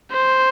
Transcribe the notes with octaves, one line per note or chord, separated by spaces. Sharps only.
C5